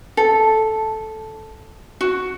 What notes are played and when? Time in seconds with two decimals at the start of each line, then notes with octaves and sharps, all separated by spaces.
0.17 A4
2.01 F#4